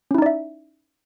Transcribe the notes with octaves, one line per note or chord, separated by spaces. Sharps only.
C#4 D#4 E4 D5 E5